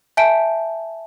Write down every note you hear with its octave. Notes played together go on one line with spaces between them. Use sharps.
E5 G#5 A5 G6 D7